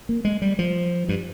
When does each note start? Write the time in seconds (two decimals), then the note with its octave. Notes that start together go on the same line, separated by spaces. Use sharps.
0.09 A#3
0.25 G#3
0.42 G3
0.59 F3
1.09 G2